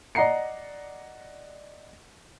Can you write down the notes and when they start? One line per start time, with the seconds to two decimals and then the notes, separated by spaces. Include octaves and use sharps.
0.15 D5 D#5 F#5 A#5 C7 C#7